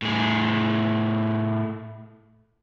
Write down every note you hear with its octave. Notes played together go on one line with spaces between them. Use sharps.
A2 G#4